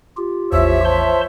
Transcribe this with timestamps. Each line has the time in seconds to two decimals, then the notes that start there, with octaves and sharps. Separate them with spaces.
0.17 F4 G4
0.52 A1 E2 F3 C#5 E5
0.85 C5 A5 C6